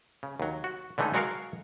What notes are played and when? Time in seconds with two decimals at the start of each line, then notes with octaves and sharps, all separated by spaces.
0.23 C#3
0.40 D#2 F#3
0.64 F#4
0.98 D3 E3 G#3 A3 C#4 D#4
1.14 F#3 G#3 F#4 A#4 C#5 F5